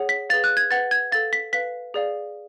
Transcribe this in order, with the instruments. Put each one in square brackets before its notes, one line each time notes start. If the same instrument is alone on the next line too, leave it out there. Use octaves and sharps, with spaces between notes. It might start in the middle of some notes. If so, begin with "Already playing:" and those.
Already playing: [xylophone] G#4 C#5 F#5
B6
G#4 B4 F5 A6
F#6
G#6
B4 F#5 A6
G#6
A4 F5 A6
B6
B4 F5 B6
G#4 D5 F5